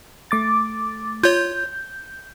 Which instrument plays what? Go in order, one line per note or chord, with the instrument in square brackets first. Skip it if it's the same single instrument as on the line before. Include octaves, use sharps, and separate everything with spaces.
[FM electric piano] A3 D6 A6
[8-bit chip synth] F4 C#5 [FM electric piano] G6